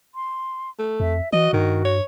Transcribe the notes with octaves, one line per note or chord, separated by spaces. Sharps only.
C6
A3
F2 E5
E3 F#4 D#5
G2 D#3
C#5